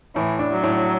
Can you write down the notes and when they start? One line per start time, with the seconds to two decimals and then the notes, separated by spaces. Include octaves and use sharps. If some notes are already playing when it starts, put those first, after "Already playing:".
0.15 A2 E3
0.39 D4
0.51 F#3
0.64 A2